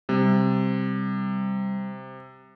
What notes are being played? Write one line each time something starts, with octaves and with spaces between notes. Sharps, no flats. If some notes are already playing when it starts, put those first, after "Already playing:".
C3 G3